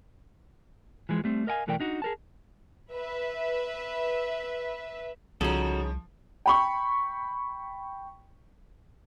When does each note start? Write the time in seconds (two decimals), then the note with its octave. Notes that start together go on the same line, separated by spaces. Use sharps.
1.09 E3 F3 G#3
1.24 G3 A3 C4
1.47 A#4 D#5 F5 G5 G#5
1.67 B1 E3 A3 A#4 D5 G5
1.80 D4 D#4 F#4
2.02 G#4 A#4 A5
2.92 B4 E5
5.41 C2 C#3 F3 C#4 D#4 F#4 A4
6.46 G5 B5 C#6